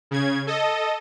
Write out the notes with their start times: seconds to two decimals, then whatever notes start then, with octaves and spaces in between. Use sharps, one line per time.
0.11 C#3 G#6
0.47 A4 D#5